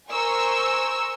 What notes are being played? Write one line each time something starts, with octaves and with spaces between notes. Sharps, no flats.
A#4 C5 G#5 C#6 E6